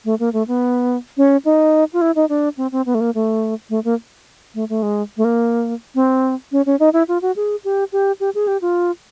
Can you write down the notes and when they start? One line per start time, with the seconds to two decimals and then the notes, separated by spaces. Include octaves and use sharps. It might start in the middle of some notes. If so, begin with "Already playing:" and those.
0.05 A3
0.20 A#3
0.33 A3
0.48 B3
1.17 C#4
1.45 D#4
1.93 F4
2.01 E4
2.16 D#4
2.29 D4
2.57 C4
2.72 C4
2.86 B3
2.95 A3
3.01 A#3
3.15 A3
3.70 A3
3.84 A#3
4.55 A3
4.69 A3
4.83 G#3
5.17 A3
5.25 A#3
5.95 C4
6.52 C#4
6.66 C#4
6.80 D#4
6.93 E4
7.08 F4
7.22 F#4
7.36 G#4
7.64 G4
7.92 G4
8.20 G4
8.35 G#4
8.48 G4
8.62 F4